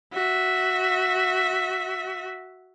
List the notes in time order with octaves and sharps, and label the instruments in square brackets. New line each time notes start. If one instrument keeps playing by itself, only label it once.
[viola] F#4 E5